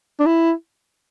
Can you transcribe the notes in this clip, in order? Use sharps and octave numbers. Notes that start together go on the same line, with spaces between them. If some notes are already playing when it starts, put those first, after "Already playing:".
D4
E4